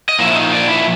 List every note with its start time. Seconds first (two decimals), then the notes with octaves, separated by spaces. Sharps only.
0.09 D#5
0.19 A#2 F3 A#3 E4 E5
0.35 D#4 D#5
0.52 D4 D5
0.68 E4 E5